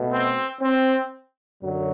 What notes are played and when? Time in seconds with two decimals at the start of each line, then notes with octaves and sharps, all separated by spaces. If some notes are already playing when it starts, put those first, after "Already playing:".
Already playing: B2 A3
0.11 C4
0.61 C4
1.62 F#2 D3 F#3